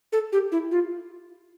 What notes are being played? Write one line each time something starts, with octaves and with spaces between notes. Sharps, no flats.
A4
G4
E4
F4